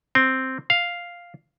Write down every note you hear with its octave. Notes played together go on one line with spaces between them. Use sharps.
C4
F5